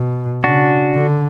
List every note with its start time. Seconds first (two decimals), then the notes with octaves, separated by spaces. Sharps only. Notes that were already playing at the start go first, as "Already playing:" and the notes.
Already playing: B2
0.44 C#3 D4 F#4
0.95 D3